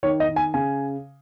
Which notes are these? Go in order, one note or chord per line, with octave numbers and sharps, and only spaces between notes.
D#3 C#5
D#5
D#3
G#5
C#3 G#5